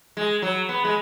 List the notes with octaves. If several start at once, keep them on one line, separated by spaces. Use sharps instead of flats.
G#3
F#3
B3
G#3